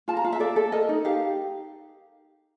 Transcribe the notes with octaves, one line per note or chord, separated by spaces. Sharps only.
F4 A5
A#5
F4 F5
E5
A4 D5
A4
A#4 D#5
D#4
G4 F5